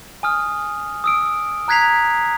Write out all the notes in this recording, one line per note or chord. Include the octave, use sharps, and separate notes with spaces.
G#5 D#6 F6
D#6 E6 D7
A#5 F#6 G#6 B6 C7 F7